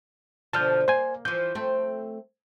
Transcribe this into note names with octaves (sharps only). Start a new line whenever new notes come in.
B2 D3 F3 A5 F6 G6
A#3 C5 G#5
E3 F3 G6
A3 C4